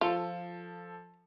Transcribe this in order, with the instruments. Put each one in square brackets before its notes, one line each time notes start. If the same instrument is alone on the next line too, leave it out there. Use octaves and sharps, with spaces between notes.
[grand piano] F3 A4 [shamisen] F4